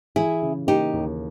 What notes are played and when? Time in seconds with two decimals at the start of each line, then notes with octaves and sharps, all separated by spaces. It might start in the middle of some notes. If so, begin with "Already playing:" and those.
0.16 E3 E4 G#4
0.42 C#3
0.67 A#3 D#4 G4
0.93 D#2